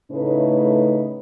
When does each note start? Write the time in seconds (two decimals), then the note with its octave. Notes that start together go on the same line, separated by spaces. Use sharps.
0.11 A2 C#3 A3 C#4 D#4 B4